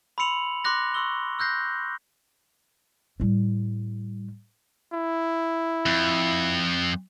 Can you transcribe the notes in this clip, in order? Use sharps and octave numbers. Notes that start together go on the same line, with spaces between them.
B5 C6 E6 C#7 F7 F#7
C6 D6 F#6 A#6
C6 C#6 E6 G7
E6 F#6 G6 A#6 C7
A2 G3
E4
F2